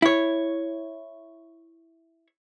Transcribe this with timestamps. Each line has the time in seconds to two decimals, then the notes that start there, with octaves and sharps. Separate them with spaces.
0.02 E4 C#5